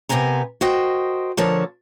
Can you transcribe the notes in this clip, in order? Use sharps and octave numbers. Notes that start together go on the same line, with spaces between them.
C3 B3 A#4 C5 G#5 A#5
F#4 A#4 C5 D#5 G5
D3 F3 A#4 C#5 A5